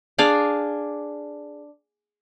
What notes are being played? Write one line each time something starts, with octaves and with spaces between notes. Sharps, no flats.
D4 G#4 D5 F5